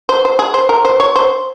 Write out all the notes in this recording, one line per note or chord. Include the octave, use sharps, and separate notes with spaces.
C5
C5
G#4
C5
A#4
C5
C#5
C5